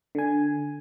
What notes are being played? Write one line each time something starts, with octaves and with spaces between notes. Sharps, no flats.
D3 G#5